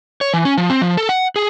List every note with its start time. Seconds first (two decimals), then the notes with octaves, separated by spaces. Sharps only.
0.21 C#5
0.33 E3
0.45 C#4
0.58 F3
0.70 C4
0.82 F3
0.97 A4
1.09 F#5
1.36 G#4